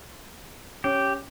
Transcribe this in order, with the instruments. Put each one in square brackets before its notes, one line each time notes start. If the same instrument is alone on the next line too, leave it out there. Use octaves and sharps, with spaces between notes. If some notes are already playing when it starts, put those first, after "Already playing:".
[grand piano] C#4 [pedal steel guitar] G4